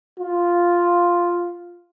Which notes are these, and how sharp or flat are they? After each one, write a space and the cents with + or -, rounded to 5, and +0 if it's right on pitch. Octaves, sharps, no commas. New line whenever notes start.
F4 +0